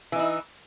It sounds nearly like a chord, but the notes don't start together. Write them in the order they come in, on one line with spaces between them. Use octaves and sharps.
E3 D#4 E4